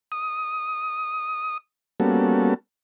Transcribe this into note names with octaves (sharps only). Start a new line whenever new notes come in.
D#6
G3 A#3 B3 C#4 F#4 A4